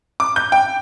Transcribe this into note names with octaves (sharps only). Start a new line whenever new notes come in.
D6
G6
G5